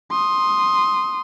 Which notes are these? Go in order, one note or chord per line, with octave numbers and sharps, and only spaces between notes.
C6 D#6